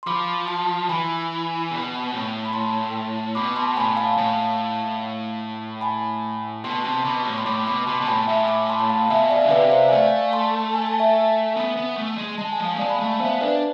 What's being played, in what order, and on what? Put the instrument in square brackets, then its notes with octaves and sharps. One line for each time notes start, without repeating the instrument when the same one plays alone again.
[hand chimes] C6
[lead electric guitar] F3 [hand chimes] B5 D6
[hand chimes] A5 C6
[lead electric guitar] E3 [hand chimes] G#5 B5
[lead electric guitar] B2
A2
[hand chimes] B5
A5 C6
[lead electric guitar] B2 [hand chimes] B5 D6
[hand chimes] A5 C6
[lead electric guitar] A2 [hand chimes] G#5 B5
[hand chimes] F5 A5
[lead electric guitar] A2
[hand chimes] G#5 B5
[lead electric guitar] B2 [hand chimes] A5 C6
[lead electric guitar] C3 [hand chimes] A5 C6
[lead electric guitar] B2 [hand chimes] B5 D6
[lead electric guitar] A2
[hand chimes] C6
[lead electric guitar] A2 [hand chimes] B5 D6
[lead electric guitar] B2 [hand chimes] B5 D6
[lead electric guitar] B2 [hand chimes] A5 C6
[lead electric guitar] B2 [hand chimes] A5
[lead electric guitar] A2 [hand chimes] G#5 B5
[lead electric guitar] A2 [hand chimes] E5 G#5
[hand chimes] B5 D6
A5 C6
B5
F5 A5
[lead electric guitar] B2 [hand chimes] E5 G#5
[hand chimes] D5 F5
[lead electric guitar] D3 [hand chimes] E5
[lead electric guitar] C3 [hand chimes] B4 D5
[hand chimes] F5
C5 E5
G#5
[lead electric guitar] A3 [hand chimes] D5 F5
[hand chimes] A5 C6
G#5
A5
E5 G#5
[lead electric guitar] B3
B3
A3
G#3
[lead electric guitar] G#3 [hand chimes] A5
[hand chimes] G#5
[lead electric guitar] F3
[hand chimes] F5 A5
[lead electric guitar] A3
[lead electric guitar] G#3 [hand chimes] D5 F5
[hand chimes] B5
[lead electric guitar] A3 [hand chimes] A5
[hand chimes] G#5
F5
[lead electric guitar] B3 [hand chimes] C5 E5
[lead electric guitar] D4 [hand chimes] B4 D5